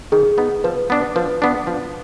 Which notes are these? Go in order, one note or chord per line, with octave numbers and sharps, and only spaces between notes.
D#3 G#4
B3 D#4
F3 B4
B3 D4
F3 B4
B3 D4
F3